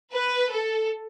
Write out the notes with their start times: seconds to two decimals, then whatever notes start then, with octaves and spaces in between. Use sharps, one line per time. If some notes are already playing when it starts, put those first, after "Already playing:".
0.12 B4
0.52 A4